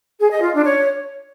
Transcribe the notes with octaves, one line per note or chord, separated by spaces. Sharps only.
G#4
D#5
F4
D4
C#5